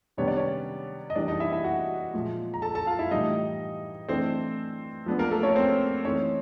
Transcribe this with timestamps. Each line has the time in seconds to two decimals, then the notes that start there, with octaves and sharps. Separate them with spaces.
0.17 C3 D#3 G3 B3 D4 C#5
0.28 D5
0.36 C#4 C#5
1.10 D#5
1.16 E3 G3 A#3 D4 D5
1.28 D#4 D#5
1.40 E4 E5
1.52 E4 E5
1.64 F#4 F#5
2.14 A#2 F3 G#3
2.54 A#5
2.62 A4 A5
2.75 A4 A5
2.87 F4 F5
2.99 E4 E5
3.11 A2 E3 G3 D#4 D#5
4.09 E3 A3 C4 D4 C5
5.06 F3 G#3 B3 D4
5.19 A#3 A#4
5.31 A3 A4
5.43 C#4 C#5
5.55 C4 C5
6.05 E3 A3 C4 C#4 D#4 C#5